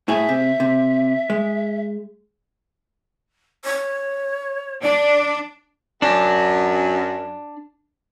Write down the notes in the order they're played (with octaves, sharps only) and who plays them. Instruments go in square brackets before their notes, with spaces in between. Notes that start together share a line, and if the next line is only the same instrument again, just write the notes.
[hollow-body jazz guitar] A2 G#4 [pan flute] E5
[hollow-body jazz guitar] C3
C3
G#3
[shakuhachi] C#5
[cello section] D4 [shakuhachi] D5
[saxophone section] F#2 [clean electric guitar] D4